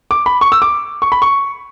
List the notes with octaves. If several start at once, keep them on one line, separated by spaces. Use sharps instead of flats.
D6
B5
C#6
E6
D6
C#6
B5
C#6